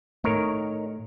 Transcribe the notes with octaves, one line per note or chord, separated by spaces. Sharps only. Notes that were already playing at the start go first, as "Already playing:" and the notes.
A2 D#3 A3 A#4 C#5